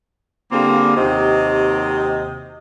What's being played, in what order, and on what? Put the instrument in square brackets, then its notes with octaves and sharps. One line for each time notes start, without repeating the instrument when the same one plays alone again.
[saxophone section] D3 G3 A#3 C4 F4 G#4
D#2 C3 C4 F#4 D#5